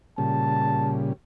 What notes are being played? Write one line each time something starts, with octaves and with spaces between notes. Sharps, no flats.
A#2 C#3 G3 A5